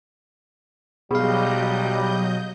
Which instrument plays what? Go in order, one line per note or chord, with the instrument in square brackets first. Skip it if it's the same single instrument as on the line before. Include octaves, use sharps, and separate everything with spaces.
[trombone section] B1 G3 [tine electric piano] B2 F5 [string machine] F#3 D#5 G6 [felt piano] G#4